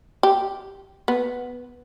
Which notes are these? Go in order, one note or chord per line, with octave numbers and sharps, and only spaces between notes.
G4
B3